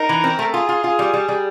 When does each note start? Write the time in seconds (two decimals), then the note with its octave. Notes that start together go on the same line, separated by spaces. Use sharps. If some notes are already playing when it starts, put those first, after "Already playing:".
Already playing: D#4 A#4
0.09 E3
0.24 C4
0.39 A3
0.54 F4 G#4
0.69 F4
0.84 F4
0.99 G3
1.13 G3
1.29 G3